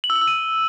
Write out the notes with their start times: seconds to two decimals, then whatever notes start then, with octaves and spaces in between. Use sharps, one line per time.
0.04 F#7
0.10 E6
0.16 F#7
0.22 E6
0.27 D#7